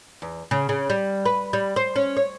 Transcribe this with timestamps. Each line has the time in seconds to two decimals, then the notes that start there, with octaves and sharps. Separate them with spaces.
0.22 E2
0.51 C#3
0.69 C#3
0.90 G3
1.25 B4
1.53 G3
1.76 C5
1.96 C#4
2.16 C#5